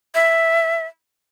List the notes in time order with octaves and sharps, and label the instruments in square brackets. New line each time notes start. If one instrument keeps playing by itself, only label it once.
[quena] E5